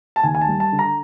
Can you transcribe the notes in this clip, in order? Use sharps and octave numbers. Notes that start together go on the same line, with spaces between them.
A5
D#2 G#5
G#5
A5
G3
A5
D3
A#5